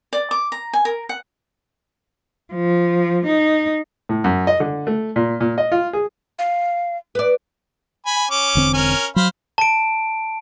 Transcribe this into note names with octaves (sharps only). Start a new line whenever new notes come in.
D5
D6
A#5
G#5
A#4
F#5
F3
D#4
A2
F#2
D#5
D3
A3
A#2
A#2
D#5
F4
G#4
F5
B4 D5
G#5 B5
C#4 D6
E1 D3 C4
C#4 A#4 G#5
F#3 C5 F5 B5
A5 D7